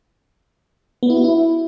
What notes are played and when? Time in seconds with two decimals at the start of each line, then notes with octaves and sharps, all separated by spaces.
1.03 B3
1.10 E4
1.17 F#4
1.24 E4